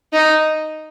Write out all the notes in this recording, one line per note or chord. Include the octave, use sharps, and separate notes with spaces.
D#4